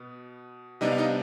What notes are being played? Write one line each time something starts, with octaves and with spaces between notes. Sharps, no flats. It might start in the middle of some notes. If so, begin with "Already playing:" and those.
Already playing: B2 B3
C3 G3 B3 D4 D#4 D#5
F5
D#4 D#5